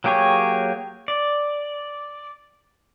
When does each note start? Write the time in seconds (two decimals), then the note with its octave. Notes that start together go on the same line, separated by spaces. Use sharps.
0.04 F#3 A#3 G4 G#4 C#5
1.08 D5